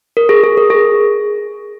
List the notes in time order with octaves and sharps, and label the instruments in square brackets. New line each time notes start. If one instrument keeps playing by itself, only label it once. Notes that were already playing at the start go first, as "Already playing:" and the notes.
[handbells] A#4
G#4
G#4
A#4
G#4